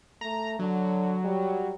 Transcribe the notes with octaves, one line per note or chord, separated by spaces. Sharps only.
A3 A#5
D3 F#3
G3